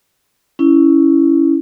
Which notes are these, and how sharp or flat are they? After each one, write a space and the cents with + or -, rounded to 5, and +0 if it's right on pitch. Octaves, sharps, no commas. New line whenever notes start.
C#4 +10 E4 +0